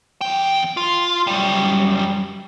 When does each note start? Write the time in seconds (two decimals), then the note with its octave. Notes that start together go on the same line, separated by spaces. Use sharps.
0.21 E2 G5
0.77 F4
1.27 F#2 G3